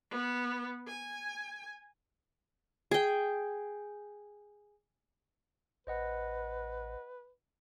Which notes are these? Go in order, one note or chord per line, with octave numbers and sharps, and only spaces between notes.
B3
G#5
G#4 G5
A1 B4 C5 D#5 F#5